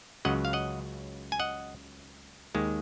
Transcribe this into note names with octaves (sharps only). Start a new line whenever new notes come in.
C#2 C#3 F#3 D#5 F#5
F5
D#5 F#5
G#5
D#5 F#5
D#2 D#3 G#3